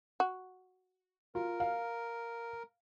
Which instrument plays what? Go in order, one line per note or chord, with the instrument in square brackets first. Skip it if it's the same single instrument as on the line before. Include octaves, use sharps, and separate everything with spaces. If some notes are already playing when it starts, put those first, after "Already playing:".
[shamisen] F#4
[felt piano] F4 [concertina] A#4
[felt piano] F5